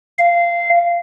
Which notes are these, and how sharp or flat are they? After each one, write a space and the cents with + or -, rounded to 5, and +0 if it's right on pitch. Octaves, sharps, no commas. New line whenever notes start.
F5 -15